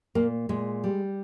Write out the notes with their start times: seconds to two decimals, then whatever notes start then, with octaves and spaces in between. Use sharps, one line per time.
0.15 A#2 A#3
0.49 A#2 G#3
0.84 G3